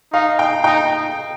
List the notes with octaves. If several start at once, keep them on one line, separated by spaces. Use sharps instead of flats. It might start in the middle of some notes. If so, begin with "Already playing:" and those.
D#4 F5
G5
D#4 G5